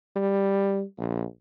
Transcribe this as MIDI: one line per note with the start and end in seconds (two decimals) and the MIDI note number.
0.16 0.83 55
0.98 1.24 34